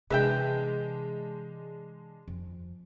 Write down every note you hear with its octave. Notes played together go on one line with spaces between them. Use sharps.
C3 E3 G#3 D4 B4 E5 G5
F2